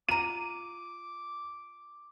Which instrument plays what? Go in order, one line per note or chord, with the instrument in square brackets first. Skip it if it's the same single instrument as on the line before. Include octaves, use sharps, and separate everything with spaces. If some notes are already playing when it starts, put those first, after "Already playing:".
[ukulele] F4 A#5 [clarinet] D6 [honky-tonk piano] D#7